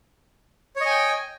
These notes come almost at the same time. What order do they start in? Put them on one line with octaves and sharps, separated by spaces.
C#5 D#5 G#5 G5